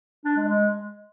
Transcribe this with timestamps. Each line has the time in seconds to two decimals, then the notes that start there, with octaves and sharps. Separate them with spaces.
0.25 D4
0.37 G#3
0.48 G#3